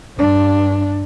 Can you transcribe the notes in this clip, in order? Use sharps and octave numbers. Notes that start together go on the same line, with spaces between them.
G2 D4